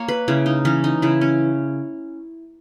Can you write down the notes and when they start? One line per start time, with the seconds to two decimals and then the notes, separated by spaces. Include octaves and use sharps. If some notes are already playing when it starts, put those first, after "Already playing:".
Already playing: A#3 C#5
0.08 B4
0.28 C#3 E4
0.46 D#4
0.65 E3 C#4
0.84 D#4
1.02 C#3 E4
1.21 C#4